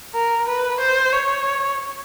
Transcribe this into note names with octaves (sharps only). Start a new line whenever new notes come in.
A#4
B4
C5
C#5